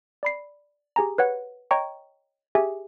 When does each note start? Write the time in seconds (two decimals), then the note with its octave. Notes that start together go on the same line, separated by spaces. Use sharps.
0.23 D5 B5 C7
0.96 G4 G#4 G#5 A#5
1.18 B4 C#5 F#5
1.71 C#5 D#5 G5 A#5 C#6
2.55 G4 G#4 E5 G#5